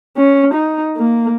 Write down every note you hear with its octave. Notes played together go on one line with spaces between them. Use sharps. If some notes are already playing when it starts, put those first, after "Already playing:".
C#4
D#4
A#3